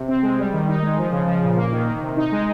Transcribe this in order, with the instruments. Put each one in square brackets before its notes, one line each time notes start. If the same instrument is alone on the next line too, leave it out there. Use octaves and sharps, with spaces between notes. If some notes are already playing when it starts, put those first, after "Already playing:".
Already playing: [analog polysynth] C3
C4
G#3
G3
D#3
D#4
G#3
F3
C#3
F3
A#2
A#3
D#3
D#3
C3
D#4
G#3